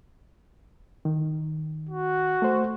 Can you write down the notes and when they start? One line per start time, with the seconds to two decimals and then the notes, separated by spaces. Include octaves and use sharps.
1.05 D#3
1.89 F#4
2.42 A3 C5